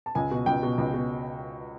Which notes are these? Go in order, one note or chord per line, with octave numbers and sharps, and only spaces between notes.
A5
C#2 G#5
B2
C#2 G5
B2
C#2
B2